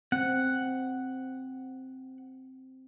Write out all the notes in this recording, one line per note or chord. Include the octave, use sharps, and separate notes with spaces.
C4 F#5